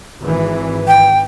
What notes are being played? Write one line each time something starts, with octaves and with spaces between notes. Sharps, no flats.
G#1 E3
G5